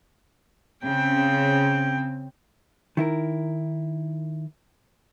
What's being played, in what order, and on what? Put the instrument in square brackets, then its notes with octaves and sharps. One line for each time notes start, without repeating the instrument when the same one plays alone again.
[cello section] C#3 C4 [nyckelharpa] G5
[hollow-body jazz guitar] D#3 E4 A#4